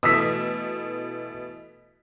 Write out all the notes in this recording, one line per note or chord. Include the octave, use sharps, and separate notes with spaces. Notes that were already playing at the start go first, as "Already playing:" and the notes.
B2 E3 A3 D#6 E6 B6